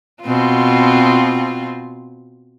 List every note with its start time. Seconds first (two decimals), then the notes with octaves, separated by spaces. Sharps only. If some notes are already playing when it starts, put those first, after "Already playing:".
0.23 B2 C4 F4